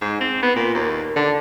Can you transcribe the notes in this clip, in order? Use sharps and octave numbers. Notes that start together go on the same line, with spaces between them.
G#2
C4
B3
A#2
D#2
D3